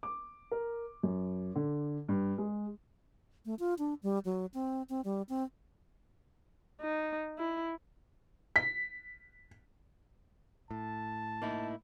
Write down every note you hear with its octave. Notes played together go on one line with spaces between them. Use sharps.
D6
A#4
F#2
D3
G2
G#3
A3
F4
D4
G3
F#3
C4
C4
G3
C4
D#4
E4
B6
A2 A5
A#3 D#4 E4